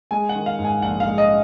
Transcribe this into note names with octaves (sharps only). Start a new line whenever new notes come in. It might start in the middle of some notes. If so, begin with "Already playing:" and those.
G#3 G#5
F#5
D#3
F5
G#2
G#5
A#1 F#5
F5
G#3
D#5